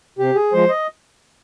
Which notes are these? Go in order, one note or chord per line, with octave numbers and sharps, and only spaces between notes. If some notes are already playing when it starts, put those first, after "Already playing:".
C3 G4
G#4
F3 G#3 C5
D#5